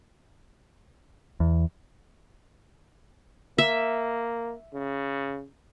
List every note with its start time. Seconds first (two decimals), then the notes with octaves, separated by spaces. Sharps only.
1.40 E2
3.58 A#3 E5
4.74 C#3